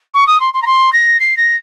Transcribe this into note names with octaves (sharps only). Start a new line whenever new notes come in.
C#6
D#6
C6
C6
A#5
C6
A#6
C7
A#6